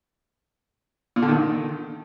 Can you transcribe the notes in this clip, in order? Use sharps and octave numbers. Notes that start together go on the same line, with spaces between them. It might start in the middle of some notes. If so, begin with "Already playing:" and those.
A#2
D3
D#3